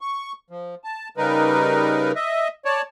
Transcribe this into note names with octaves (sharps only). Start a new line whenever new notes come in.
C#6
F3
A5
C#3 G3 D#4 A#4 B4
D#5 E5
C#5 D5 A5